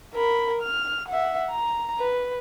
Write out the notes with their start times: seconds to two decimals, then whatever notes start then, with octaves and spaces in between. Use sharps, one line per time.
0.14 A#4 B5
0.62 F6
1.09 E5 F#5
1.51 A#5
1.99 B4